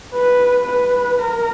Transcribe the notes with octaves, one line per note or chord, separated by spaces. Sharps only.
B4
B4
A#4